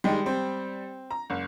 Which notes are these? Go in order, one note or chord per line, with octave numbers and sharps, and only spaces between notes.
D#3 G3 G#3 G5
C4
A#5
F#1